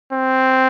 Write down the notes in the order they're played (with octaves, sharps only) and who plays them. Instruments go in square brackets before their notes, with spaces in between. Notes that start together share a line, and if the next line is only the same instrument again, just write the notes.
[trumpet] C4